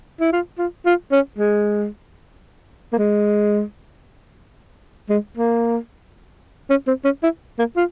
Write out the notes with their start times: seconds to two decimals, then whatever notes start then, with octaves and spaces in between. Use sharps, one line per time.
0.20 E4
0.33 F4
0.59 F4
0.86 F4
1.12 C#4
1.39 G#3
2.93 A#3
2.98 G#3
5.10 G#3
5.37 A#3
6.70 C#4
6.88 C4
7.05 C#4
7.23 E4
7.59 A#3
7.76 F4